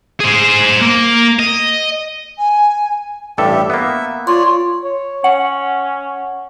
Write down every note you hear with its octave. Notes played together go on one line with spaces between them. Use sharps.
G#4 C5
A#3
D#5
G#5
A1 G2 G4 A4 E5
A#3 B3 E5
F4 C#5 D5 C6
C#5
C#4 F#5